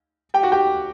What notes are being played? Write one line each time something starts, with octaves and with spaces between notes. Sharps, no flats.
G4 G5
F#4 F#5
G4 G5